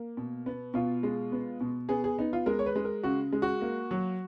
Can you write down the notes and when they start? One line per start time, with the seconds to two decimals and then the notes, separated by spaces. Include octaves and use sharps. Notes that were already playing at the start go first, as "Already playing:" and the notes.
Already playing: A#3
0.17 B2
0.46 B3
0.74 B2 F4
1.03 G#3
1.32 B3
1.61 B2
1.89 B3 G#4
2.04 G#4
2.19 B3 D#4
2.33 F4
2.46 G#3 A#4
2.59 C#5
2.66 B4
2.76 G#3
2.84 A#4
3.03 C#3 F#4
3.33 G#3
3.42 F#4
3.62 A#3
3.91 F#3